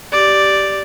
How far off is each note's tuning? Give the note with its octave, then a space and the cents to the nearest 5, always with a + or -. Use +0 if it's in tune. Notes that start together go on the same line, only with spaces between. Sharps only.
G4 -10 D5 +0